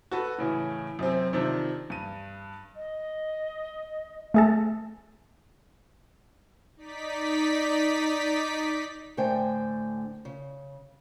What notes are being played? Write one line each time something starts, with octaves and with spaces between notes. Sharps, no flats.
F#4 A4 B4
A2 C#3 E3
F#2 C3 C4
C3 D#3 F3 D4
G2 D#7
D#5
A3 G#4 A4
D#4 D5 B6
A2 D3 A3 C5 G5 G#5
C#3